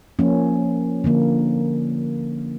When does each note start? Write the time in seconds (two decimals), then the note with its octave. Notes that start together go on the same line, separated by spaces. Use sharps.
0.19 F3 A#3 C#4
1.04 D3 F3 A#3